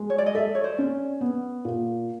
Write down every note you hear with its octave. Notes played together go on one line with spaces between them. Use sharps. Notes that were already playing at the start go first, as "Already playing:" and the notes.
Already playing: G#3
C#5
D5
D#5
A4 D5 E5
C#5
C5 D5
C#4
B3
A#2